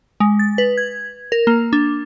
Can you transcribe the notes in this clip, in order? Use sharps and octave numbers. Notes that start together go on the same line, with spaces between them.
G#3
A6
B4
G#6
A#4
A#3
D4